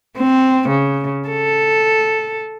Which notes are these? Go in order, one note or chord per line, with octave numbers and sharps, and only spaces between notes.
C4
C#3
A4